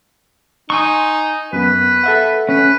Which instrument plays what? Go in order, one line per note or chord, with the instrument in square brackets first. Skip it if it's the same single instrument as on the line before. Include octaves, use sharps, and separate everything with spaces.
[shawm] D#4 [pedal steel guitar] G#5 C6 C#6
[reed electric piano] F#2 B3 [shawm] B4
[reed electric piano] A4 E5 F#5
[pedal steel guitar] C#4 [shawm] B4